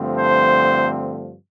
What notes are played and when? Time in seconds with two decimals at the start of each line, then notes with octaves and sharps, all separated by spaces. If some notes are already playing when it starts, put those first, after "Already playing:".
Already playing: G2 D3 F3 A3 C4
0.17 C5